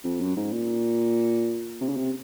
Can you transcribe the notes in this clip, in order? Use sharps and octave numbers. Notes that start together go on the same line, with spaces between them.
F2
F#2
G#2
A#2
C3
C#3
C3